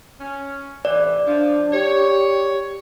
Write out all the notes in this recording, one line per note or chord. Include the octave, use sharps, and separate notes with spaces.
C#4
A2 C3 E3 D5
F3 D4
G4 C#5